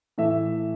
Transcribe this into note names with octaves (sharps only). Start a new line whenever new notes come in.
A2 E3 A3 E5